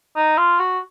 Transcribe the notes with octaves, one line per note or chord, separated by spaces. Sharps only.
D#4
F4
F#4